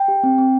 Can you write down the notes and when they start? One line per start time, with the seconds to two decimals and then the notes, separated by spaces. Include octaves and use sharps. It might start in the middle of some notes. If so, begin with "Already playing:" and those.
Already playing: G5
0.08 G4
0.23 C4
0.38 C4